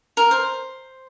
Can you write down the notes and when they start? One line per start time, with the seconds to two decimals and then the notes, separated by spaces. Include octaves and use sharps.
0.17 A#4
0.31 C5